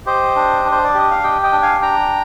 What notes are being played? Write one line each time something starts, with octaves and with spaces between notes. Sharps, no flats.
G4 C5 D#5
D4
D4
C5
D5
G4 D#5
F5
G4 D#5 G5
D#5 G5
D4
F5 G#5
D4 G5 A#5